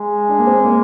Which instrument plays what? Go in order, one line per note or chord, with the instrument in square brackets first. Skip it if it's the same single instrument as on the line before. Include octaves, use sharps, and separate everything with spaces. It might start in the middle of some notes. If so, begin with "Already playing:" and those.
Already playing: [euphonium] G#3
[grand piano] D4
A#3
C4
A#3